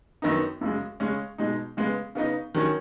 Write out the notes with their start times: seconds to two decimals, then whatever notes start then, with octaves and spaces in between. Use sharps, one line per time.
0.22 F#2 D#3 B3 D#4
0.61 F#2 C#3 G#3
1.00 C#3 G#3 C#4
1.38 B2 G#3 D#4
1.77 C#3 G#3 B3
2.15 C#3 B3 D#4
2.54 D#3 F#3 C#4